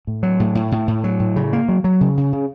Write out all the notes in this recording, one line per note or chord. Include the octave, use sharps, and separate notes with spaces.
A2
F#3
A2
A2
A2
A2
F#3
A2
C#3
A#3
F#3
F#3
C#3
C#3
C#3